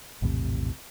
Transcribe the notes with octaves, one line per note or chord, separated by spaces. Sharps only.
A#1 E2 A2 C3